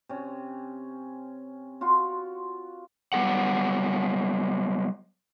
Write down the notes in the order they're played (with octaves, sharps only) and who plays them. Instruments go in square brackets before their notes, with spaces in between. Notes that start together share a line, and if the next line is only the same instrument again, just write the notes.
[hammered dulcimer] C3 C#4
F4 F#4 C6 C#6
[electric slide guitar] F#3 G3 B3 G#4 F#5